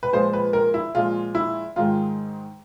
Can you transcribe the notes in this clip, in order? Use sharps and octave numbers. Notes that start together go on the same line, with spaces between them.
B4
A#2 F3 G#3 C5
B4
A#4
E4
A#2 F3 G#3 F4
E4
G#2 D#3 G#3 F4